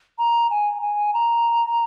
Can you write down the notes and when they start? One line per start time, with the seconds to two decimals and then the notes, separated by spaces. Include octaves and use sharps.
0.19 A#5
0.51 G#5
0.82 G#5
1.14 A#5